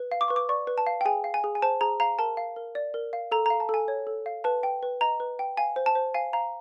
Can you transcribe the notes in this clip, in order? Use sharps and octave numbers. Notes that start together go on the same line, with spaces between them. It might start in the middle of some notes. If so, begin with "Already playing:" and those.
Already playing: B4
F5
D6
B4 C#6
D6
D5 C#6
B4
A5
F5
G5
G#4 G#5
F5
G#5
G#4
G#5
C5 A5
G#4 A#5
F5 A#5
A#4 A5
F5
A#4
D5
A#4
F5
A4 A#5
A#5
F5
A5
A4 G#5
C#5
A4
F5
B4 A5
G5
B4
D#5 A#5
B4
G5
F5 G#5
C5
A5
C5
F5 G#5
F5 A#5